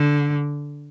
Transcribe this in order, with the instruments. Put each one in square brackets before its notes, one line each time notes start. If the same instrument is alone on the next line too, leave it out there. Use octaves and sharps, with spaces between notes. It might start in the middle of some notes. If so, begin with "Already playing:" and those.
Already playing: [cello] D3